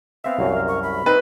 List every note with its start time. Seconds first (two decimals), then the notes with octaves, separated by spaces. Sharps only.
0.24 B3 C4 E5 F5
0.39 C2 F#2 F#3
0.55 A#4
0.68 C#6
0.83 B5
1.06 C4 D#4 B4